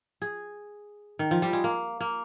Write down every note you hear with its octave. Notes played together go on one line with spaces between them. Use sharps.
G#4
D#3
F3
G3
G#3
A#3
A#3